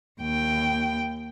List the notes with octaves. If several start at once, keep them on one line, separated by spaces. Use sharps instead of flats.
D#2 G5